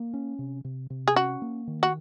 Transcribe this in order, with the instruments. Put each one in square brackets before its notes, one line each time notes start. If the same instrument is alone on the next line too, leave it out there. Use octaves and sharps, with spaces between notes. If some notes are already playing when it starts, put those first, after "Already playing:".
Already playing: [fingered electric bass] A#3
C#4
C3
C3
C3
[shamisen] G#4
[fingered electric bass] C#4 [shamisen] F#4
[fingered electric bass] A#3
D#3
[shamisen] F#4